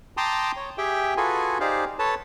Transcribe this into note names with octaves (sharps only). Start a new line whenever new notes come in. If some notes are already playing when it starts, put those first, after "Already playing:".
G5 A5 A#5 C6 D6 D#6
C#5
G4 G#4 E5 G5
F4 F#4 G#4 A4 B4 G#5
D#4 G4 G#4 C5 D5 F5
A4 B4 C#5 A5